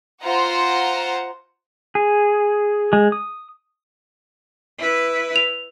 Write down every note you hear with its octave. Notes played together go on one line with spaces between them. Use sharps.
F4 C5 F#5 A#5
G#4
G#3
D#6
E4 B4
F7